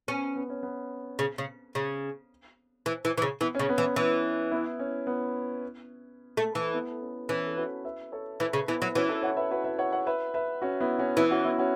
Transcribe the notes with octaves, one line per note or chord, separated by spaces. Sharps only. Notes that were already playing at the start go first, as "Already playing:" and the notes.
B3 C#4
B3
C#4
B3
C#3
C#3
C#3
E3
E3
E3
C#3
E3 B3
C#4
C#3
B3
E3
C#4
E3
B3 E4
C#4
B3
A3
E3
B3 E4
C#4
E3 C#4
A4
F#4 B4
B4 E5
A4 C#5
E3 B4 E5
C#3
E3 B3 E4
F#3
E3 C#4 F#4
E4 A4
C#5 F#5
B4 E5
F#4 B4
B4 E5
C#5 F#5
C#5 F#5
B4 E5
B4 E5
C#4 F#4
B3 E4
C#4 F#4
E3 B3 E4
C#4 F#4
B3 E4
C#4 F#4